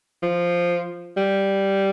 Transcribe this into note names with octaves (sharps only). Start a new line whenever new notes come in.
F3
G3